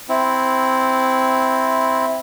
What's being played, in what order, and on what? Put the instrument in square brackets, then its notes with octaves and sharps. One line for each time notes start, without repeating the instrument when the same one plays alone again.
[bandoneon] C4 E4